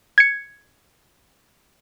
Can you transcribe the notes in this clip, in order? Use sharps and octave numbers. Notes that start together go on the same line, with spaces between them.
G#6 C#7